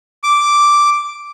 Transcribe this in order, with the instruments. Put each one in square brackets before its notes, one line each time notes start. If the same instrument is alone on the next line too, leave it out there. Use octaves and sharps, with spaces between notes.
[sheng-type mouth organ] D6